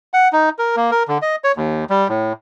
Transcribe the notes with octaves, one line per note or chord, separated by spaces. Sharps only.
F#5
D#4
A#4
A#3
A#4
D3
D#5
C#5
D#2
G3
A2